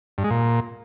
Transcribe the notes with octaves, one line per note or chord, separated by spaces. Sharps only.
G2
G#3
A#2